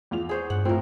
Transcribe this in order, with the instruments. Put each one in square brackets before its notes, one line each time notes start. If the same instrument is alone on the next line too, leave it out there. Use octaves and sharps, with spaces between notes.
[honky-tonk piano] E2 F4 F7
[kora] G#4 C5 C#5
[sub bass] G2 [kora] F#5
[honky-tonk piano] A2 A3 [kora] C4 A#4 [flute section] F4